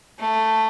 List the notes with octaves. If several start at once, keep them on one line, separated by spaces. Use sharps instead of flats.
A3